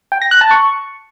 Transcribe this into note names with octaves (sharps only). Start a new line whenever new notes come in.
G5
A#6
F#6
A5
C#6